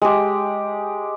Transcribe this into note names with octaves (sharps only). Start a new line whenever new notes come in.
G#3 G4